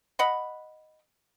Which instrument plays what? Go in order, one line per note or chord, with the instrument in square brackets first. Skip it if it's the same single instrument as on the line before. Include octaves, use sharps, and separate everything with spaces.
[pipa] D#5 F#5 B5